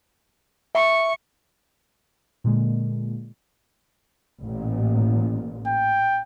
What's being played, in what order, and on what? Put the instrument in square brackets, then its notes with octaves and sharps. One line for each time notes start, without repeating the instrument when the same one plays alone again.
[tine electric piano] E5 [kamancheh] C#6
[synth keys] A#2 D3 G#3 A#3
[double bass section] A1 A#2
[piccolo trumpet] G5